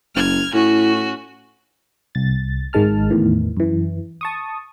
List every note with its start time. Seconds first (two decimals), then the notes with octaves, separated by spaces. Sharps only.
0.15 F#1 F6 G#6
0.54 A2 C#4 E4 F#4
2.15 C2 A6
2.73 G#1 D#3 G#3 A5 F6
3.10 E2 A2 D#3 E3
3.57 F#2 E3
4.21 A5 C#6 D#6